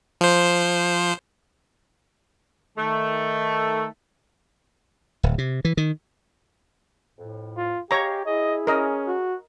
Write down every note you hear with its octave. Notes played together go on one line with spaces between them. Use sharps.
F3 C5
D#3 A3
D1
C3
E3
D#3
F2 A2
F4
G4 G#4 C#5 D#5 F5 A#5
E4 G#4 D#5
C#4 A#4 D#5
F#4